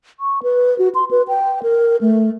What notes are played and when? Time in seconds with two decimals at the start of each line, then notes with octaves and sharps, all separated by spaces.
0.20 C#6
0.43 B4
0.79 F#4
0.95 C6
1.11 B4
1.28 G5
1.63 A#4
2.01 A3